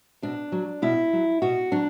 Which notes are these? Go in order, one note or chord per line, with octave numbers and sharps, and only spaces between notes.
B2 D4
F#3
B2 E4
F#3
B2 F#4
F#3 D4